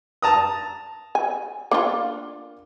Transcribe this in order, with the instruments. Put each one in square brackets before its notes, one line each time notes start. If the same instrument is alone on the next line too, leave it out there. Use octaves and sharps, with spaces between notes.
[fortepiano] A5 A#5 D#6
[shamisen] G#5
A#3 D4 F4